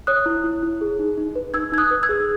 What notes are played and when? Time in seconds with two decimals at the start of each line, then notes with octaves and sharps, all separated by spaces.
0.07 C#5 D#6 F#6
0.26 E4
0.44 E4
0.63 E4
0.81 G#4
0.99 D#4
1.18 D#4
1.35 B4
1.54 D#4 E6 G#6
1.72 D#4 G#6
1.78 D#6 F#6
1.91 B4
2.03 E6 G#6
2.09 G#4